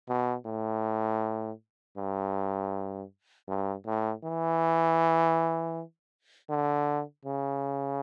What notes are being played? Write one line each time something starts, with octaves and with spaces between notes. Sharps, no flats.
B2
A2
G2
G2
A2
E3
D3
C#3